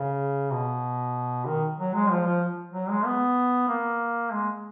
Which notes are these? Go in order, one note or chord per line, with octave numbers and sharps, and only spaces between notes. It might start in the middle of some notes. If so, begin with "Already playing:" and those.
Already playing: C#3
B2
D#3
F#3
G#3
F3
F3
F#3
G#3
B3
A#3
G#3